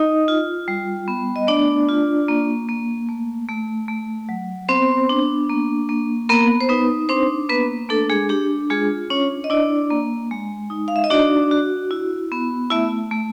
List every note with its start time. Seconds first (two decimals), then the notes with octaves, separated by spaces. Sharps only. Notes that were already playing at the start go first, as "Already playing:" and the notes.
Already playing: D#4 D#5
0.28 F4
0.68 G3
1.08 B3
1.36 D#5
1.47 A3 D4 D5
1.89 F4
2.28 A#3
2.69 A#3
3.09 A3
3.49 A3
3.88 A3
4.29 F#3
4.69 B3 C4 C5
5.09 D4
5.49 A#3
5.89 A#3
6.29 A#3 B3 A#4
6.61 C5
6.69 B3 D#4 B4
7.09 C4 D4 C5
7.49 A#3 B3 B4
7.89 A3 D4 A4
8.10 G#3 G#4
8.29 D4 G4
8.70 G#3 F4 G#4
9.10 C#4 D4 C#5
9.44 D#5
9.50 D4 E4 D5
9.90 A#3
10.31 G#3
10.70 D#4
10.88 F5
10.96 E5
11.04 D#5
11.10 D4 F#4 D5
11.51 F#4
11.91 E4
12.32 B3
12.71 A3 E4 E5
13.11 A3